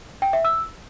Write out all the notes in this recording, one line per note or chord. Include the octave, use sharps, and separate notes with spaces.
G5
E5
E6